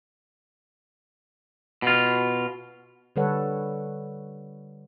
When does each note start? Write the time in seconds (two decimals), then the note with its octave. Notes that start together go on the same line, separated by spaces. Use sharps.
1.82 B2 F4
3.16 D3 G3 A4 B4 C#5 F#5